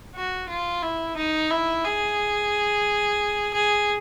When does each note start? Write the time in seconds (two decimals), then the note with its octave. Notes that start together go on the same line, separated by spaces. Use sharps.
0.15 F#4
0.49 F4
0.83 E4
1.17 D#4
1.51 E4
1.85 G#4
3.54 G#4